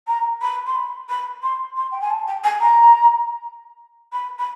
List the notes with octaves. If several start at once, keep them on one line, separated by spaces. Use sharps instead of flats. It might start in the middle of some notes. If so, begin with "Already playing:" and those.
A#5
B5
C6
B5
B5
C6
C6
G5
G#5
A5
G5
G#5
A#5
B5
B5